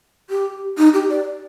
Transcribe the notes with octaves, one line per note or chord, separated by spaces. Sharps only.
G4
D#4
G4
D5